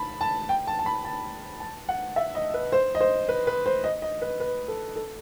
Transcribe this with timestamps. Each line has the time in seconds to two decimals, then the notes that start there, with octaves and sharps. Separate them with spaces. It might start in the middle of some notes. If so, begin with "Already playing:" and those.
Already playing: A5 B5
0.21 A5
0.49 G5
0.67 A5
0.79 A5
0.86 B5
1.05 A5
1.60 A5
1.89 F#5
2.16 E5
2.35 D#5
2.54 B4
2.72 C5
2.95 D#5
3.00 C5
3.29 B4
3.47 B4
3.66 C5
3.84 D#5
4.02 D#5
4.22 B4
4.40 B4
4.68 A4
4.96 A4